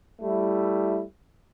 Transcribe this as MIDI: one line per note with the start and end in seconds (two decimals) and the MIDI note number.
0.21 1.01 55
0.21 1.01 57
0.21 1.01 64